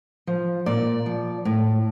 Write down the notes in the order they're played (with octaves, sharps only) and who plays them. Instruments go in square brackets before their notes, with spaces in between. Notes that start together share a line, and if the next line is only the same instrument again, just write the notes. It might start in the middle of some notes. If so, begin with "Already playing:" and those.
[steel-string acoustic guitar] F3
A#2 D5
F3
A2